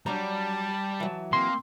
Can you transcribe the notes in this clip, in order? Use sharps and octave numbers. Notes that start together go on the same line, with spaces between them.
F#3 G3 D4 A5 A#5
E3 F#3
A#3 C4 C6